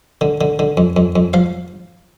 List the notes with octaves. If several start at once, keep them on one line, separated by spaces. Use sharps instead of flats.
D3
D3
D3
F2
F2
F2
F3 F5